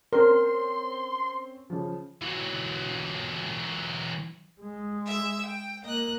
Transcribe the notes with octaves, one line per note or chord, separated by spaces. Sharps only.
C4 C#4 A#4 C6
C#3 F3
E3 F#3
G#3
E5 E6
G5
A#3 D#5 F#6